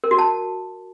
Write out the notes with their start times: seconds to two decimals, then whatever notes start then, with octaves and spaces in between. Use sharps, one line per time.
0.04 A#4
0.11 F#4
0.18 A5